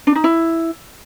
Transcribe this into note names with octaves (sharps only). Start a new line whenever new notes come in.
D4
D#4
E4